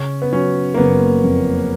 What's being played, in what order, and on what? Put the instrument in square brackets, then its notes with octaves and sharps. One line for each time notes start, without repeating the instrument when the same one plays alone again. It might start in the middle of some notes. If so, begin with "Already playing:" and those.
Already playing: [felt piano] C#3 [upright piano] C#4
[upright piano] B3
[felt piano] F#3 [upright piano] C#4
[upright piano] A#3
[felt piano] F#1 [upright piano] B3
[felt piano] F2